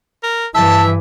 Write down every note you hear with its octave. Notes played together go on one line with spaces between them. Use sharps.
A#4
G2 E3 E5 A5